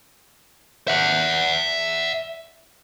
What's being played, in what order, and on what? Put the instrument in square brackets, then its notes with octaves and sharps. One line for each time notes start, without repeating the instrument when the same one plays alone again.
[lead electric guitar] E5 F#5